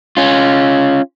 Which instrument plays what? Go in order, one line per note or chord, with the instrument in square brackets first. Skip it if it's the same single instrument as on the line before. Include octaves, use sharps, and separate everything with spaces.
[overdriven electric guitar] C#4 F4